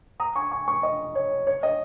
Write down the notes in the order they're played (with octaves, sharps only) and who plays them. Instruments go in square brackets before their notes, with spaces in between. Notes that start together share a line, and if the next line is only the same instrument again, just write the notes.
[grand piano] A#5 D#6
G#5 C#6
G#5 C#6
G#5 C#6
D#5
C#5
C#5
D#5